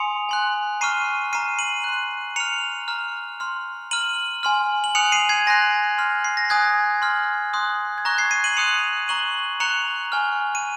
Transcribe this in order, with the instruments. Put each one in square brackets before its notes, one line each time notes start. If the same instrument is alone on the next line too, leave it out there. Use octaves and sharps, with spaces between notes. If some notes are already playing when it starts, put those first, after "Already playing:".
Already playing: [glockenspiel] G#5 C6 D#6 C#7 F7
G#5 C6 F#6
A#5 C#6 F6 C7 D#7
A#5 F6 C7 D#7
D#7 F#7
C6 F#6
A#5 F6 C#7 F7
A#5 F6
C6 F6
A#5 F6 D#7 F#7
G#5 C6 F6
F#7
G#5 D#6 F#6 C#7 F7
C7 D#7
G#6 C7
G#5 C6 F#6 A#6
C6 F6
C7
A#6
G#5 D#6 F#6 G#6
C6 F6
C6 D#6 F#6
G#6
A#5 C#6 F#6 A#6
G#6 C7
C7 D#7
D#7 F#7
C6 D#6 F#6 C#7 F7
A#5 C#6 F#6 D#7 F#7
A#5 C#6 F#6 C#7 F7
G#5 C#6 F6
D#7